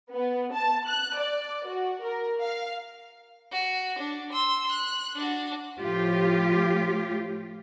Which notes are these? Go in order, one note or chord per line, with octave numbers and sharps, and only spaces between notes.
B3
A5
F#6
D5
F#4
A#4
F5
F#4
D4
C6 E6
F#6
D4 F#4
A2 F3 F4 G4